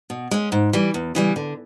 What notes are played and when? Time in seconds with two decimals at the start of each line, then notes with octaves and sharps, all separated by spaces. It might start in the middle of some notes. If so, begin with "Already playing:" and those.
0.10 B2
0.31 G#3 C#4
0.52 G#2
0.73 E3 G3
0.94 E2
1.15 C#3 E3 G3
1.36 D3